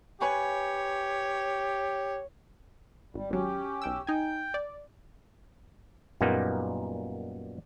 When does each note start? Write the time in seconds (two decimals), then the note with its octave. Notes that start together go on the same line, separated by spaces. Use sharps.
0.21 G4 B4 C#5 G#5 C#6
3.14 G#1 G3
3.30 G#1 F#3 C#4 G4
3.82 B1 G5 E6
4.07 D#4 G5 G#5
4.54 D5
6.21 F#2 A#2 G3 A#3 B3 D#4